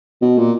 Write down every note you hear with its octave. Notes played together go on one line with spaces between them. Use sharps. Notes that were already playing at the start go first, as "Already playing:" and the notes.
B2
A#2